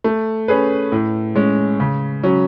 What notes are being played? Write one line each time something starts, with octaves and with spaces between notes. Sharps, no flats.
A3
C#4 G#4 B4
A2
G#3 C#4
C#3
F#3 C#4